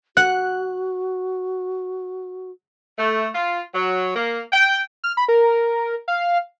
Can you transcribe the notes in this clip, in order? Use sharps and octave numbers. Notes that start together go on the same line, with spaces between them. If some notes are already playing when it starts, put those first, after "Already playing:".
F#4 F#5 F#6
A3
F4
F#3
A#3
G5
F6
B5
A#4
F5